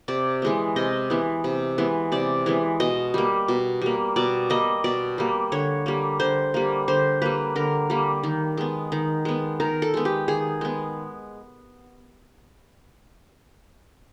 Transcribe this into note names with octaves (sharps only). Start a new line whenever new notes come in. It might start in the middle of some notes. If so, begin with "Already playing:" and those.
C3 D5
E3 G#3 B3
C3 D#5
E3 G#3 B3
C3
E3 G#3 B3
C3 D5
E3 G#3 B3
B2 D#5
G3 A#3
B2
G3 A#3
B2 D5
G3 A#3 D#5
B2 D5
G3 A#3
D3 C#5
G3 A#3
D3 C5
G3 A#3
D3 C5
G3 A#3 B4
D3 A#4
G3 A#3
D#3
G#3 B3
D#3
G#3 B3
D#3 A#4
A4
G#3 B3
G4
D#3 G#4
G#3 B3